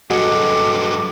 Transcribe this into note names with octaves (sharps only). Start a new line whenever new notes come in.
G2 F#3 F#4 G#4 A4 D#5 D6